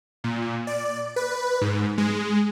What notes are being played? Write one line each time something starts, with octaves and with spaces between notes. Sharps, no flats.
A#2
D5
B4
G#2
G#3